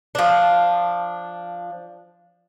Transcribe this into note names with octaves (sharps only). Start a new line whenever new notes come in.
F3 D4